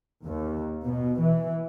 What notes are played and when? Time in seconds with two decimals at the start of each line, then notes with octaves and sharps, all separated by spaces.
0.25 D#2
0.85 B2
1.20 E3